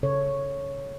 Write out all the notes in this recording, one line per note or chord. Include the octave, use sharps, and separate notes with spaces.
C#3 A4 C#5